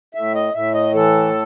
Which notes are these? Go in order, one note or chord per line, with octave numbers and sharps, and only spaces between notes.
A2 E5
D#5
A2 E5
D#5
E3 A4